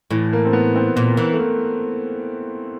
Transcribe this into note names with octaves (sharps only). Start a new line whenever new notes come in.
A2 E3
A#3
C4
B3
C4
A#2 B3
E3 A#3
A3
A#3